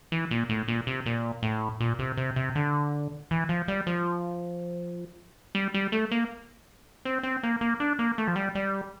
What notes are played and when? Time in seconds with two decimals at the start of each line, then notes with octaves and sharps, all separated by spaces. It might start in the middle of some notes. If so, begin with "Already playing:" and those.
0.12 E3
0.31 A#2
0.49 A2
0.68 A#2
0.87 C3
1.06 A#2
1.43 A2
1.80 A#2
1.99 C3
2.17 C3
2.36 C3
2.55 D3
3.31 E3
3.49 F3
3.68 G3
3.87 F3
5.55 G3
5.74 G3
5.92 A3
6.11 A#3
7.05 C4
7.23 C4
7.43 A#3
7.61 A#3
7.80 D4
7.99 A#3
8.18 A3
8.28 F3
8.36 G3
8.55 G3